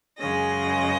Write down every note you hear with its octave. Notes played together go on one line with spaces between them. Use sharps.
F#2 C#3 G#3 D#5